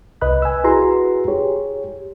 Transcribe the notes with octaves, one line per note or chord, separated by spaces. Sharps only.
C2 B4 D#5 B5 F#6
G#5 E6
E4 F#4 G#4 B4 A#5 C6
G4 G#4 C#5